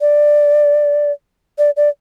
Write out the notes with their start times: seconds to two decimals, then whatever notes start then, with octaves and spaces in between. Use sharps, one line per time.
0.01 D5
1.58 D5
1.77 D5